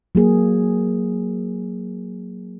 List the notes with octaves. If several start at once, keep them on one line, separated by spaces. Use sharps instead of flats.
F#3 A#3 G#4